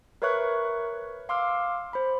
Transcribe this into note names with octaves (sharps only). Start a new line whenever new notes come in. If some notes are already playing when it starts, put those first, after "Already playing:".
A#4 B4 C#5 E5 C#6 F#6
F5 C6 D6 E6 F6
C5 B5